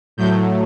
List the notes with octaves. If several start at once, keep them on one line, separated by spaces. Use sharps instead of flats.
A2 F#3 A3 G6